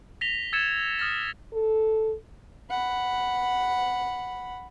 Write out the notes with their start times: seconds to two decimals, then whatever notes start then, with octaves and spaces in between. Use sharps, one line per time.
0.21 A#6 B6 F7 G7
0.53 E6 G#6 A6 C#7 E7
0.99 D#6 F6 A6 A#6
1.53 A4
2.70 F#5 B5